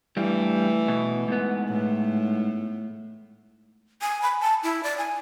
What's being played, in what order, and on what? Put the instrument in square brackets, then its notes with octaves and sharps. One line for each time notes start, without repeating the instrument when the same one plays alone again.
[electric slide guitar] G2 G3 [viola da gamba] E3 A3
[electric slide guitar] B2
G#2 B3
[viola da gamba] A2
[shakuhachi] G#5
B5
A5
E4
D5
G#5